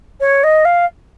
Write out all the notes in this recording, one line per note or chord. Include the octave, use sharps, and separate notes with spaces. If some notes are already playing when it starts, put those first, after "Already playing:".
C#5
D#5
F5